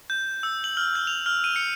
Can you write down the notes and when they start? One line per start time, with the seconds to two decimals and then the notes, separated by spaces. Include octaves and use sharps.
0.10 G6
0.43 E6
0.64 F#7
0.77 F6
0.95 G6
1.07 F7
1.26 F6
1.44 D#7
1.56 C#7